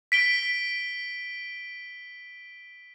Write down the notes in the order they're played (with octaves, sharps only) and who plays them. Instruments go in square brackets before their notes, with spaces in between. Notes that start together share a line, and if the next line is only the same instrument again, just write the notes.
[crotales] B6 D7 G7